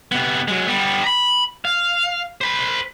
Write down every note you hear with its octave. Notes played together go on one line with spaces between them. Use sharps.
C3 B3
F#3 G#3
G3 B3
A#5 B5
F5
C5 B5